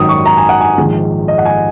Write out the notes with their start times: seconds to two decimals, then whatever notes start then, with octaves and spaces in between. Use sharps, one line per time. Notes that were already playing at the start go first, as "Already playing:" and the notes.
Already playing: G#1 F#2 D#3 F#3 D#6
0.09 C#6
0.26 A#5
0.37 G#5
0.49 F#5
0.61 G#5
0.77 A#1 G#2 D#3
1.28 D#5
1.38 F#5
1.45 G#5